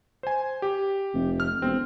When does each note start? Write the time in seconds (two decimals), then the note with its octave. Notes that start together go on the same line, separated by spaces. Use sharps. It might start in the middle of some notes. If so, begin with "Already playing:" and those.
0.23 C5 G#5
0.62 G4
1.14 F1
1.40 F6
1.62 E1 C4